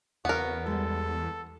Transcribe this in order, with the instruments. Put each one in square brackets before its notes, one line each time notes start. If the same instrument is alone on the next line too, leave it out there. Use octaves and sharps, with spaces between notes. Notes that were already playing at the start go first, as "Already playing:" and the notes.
[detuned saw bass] E2 [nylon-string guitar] C#3 C4 [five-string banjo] B3 A#4 [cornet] F#4
[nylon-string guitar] G3 G#3 [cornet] A4